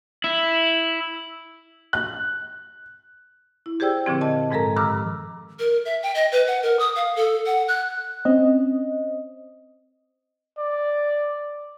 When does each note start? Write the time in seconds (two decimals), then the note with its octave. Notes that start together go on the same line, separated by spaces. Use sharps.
0.24 E4
1.93 F#6
3.66 E4
3.80 G4 G#4 C5 D5 G5 E6
4.06 A#2 D3 F3 C4
4.21 D#5 A5
4.50 G#2 F3 G#3 A4 A#4 A#5
4.76 G2 D#3 A#5 D6 E6 F6
5.59 A#4
5.85 E5
6.03 G5
6.15 D#5
6.32 B4
6.48 F#5
6.63 A#4
6.79 D#6
6.96 F5
7.16 A4
7.46 F#5
7.68 F#6
8.25 C4 C#4 D#5
10.58 D5